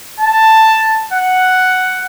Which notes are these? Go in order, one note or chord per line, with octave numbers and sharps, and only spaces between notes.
A5
F#5